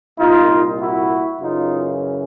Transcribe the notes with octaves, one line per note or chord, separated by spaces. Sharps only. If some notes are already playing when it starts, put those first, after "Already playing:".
C2 A#2 D#4 F4
E4 F#4
F#2 C#3 E3 D#4 F4